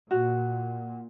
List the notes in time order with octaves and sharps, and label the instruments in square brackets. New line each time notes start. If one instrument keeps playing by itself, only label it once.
[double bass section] A#2 [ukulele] F#4